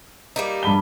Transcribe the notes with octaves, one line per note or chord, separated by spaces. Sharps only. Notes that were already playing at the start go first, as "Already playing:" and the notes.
G3 A#3 D#4
G2 B5 G7